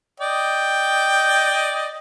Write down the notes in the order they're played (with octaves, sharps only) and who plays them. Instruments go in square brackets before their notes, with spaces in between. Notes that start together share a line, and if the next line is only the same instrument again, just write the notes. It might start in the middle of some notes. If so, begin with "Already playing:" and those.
[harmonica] D5 D#5 G5